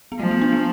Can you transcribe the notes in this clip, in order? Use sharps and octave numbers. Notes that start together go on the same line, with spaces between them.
B3
F3 A3
B3
D4
B3